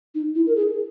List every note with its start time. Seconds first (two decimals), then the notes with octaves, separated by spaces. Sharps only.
0.15 D#4
0.35 E4
0.47 A#4
0.56 G#4